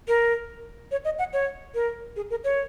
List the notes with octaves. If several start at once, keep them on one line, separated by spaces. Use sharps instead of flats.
A#4
C#5
D#5
F#5
C#5
A#4
G#4
A#4
C#5